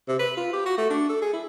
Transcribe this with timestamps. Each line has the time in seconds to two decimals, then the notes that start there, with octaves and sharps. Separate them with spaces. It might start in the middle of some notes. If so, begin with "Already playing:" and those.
0.08 C3
0.19 B4
0.37 F4
0.53 G4
0.66 F#4
0.78 A3
0.90 D4
1.09 A4
1.21 G#4
1.33 E4